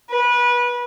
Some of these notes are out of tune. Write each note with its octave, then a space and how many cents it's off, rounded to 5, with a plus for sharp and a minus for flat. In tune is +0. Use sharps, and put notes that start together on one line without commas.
B4 -25